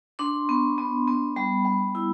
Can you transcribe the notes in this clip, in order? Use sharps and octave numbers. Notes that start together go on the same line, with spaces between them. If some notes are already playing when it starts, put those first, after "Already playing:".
D4 C6
B3
B3
B3
G3 B5
G3
E4